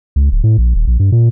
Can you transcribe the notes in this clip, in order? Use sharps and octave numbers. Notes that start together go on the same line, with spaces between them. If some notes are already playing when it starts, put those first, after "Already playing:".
C#2
D1
A2
A#1
D#1
A#1
G2
A#2